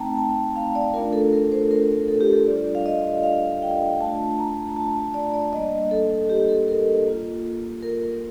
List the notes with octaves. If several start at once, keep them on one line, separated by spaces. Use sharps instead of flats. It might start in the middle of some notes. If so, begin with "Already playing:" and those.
Already playing: A3 C4 D#4 G5 A5 A#5
A5
F5
D5
A3 D4 F4 A#4
A4
A#4
C5
A#4
A4
G4
A4
G3 D4 F4 D5
F5
D#5
F5
G5
A3 D4 F4 A5
A#5
A5
A5
D5
D5
G3 A#3 D4 D#5
A4
G4
A4
A#4
A#3 F4
A#4